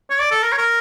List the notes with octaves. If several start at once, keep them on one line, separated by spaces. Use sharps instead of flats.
C#5
D5
A4
A#4
C#5
A#4